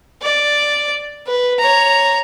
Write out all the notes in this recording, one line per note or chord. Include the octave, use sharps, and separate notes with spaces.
D5
B4
C#5 A#5